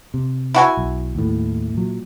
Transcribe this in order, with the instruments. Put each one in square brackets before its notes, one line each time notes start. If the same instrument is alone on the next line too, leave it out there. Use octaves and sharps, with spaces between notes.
[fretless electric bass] C3
[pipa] E4 F#4 G#5
[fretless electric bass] B1
D#2 A2
A#2 F#3